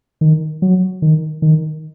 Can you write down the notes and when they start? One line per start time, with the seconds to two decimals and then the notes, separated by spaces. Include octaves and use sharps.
0.21 D#3
0.62 F#3
1.02 D#3
1.42 D#3